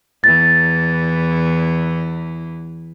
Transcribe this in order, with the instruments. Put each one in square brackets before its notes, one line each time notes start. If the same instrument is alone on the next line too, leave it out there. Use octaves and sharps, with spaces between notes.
[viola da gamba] E2 E3 [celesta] A6